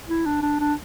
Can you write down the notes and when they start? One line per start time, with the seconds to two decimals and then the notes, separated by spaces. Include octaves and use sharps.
0.09 E4
0.26 D4
0.42 D4
0.60 D4